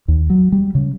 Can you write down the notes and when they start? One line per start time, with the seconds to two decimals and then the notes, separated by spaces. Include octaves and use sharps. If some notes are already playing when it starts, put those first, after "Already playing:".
0.08 D#2
0.30 F#3
0.52 G3
0.75 C#3